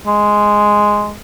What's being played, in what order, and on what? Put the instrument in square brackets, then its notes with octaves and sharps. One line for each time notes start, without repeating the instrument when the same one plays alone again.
[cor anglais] G#3